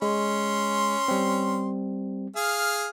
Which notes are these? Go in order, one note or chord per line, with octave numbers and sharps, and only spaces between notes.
G#3 C#4 C6
G3 C4
G#4 F5 F6